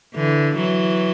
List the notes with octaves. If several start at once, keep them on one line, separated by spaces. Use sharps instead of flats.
D3 E3
E3 F#3